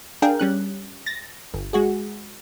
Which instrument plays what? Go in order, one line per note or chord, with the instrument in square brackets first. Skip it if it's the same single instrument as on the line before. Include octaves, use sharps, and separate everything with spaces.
[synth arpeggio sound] D4 G#4 A#4 F5 G5
G3 C#4 F#6
A6 A#6
G1
G#3 F#4 G#4